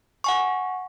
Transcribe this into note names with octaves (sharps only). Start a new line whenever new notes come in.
F#5 G#5 C#6